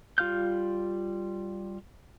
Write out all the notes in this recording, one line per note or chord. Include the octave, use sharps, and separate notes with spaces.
G3 F4 F5 F6 G6